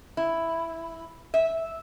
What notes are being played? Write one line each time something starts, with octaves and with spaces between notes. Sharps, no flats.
E4
E5